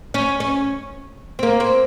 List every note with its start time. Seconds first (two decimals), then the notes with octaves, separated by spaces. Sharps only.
0.14 C#4
0.40 C#4
1.39 C4
1.43 A#3
1.60 C4